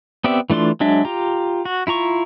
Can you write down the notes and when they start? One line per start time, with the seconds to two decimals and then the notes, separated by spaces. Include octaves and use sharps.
0.24 B3 C4 G4 D5 E5
0.50 E3 A3 D4 F4 C6
0.80 F#3 G#3 D4 E5
1.05 F4 G4 A#5
1.65 F#4
1.87 E4 F4 A#5 C#6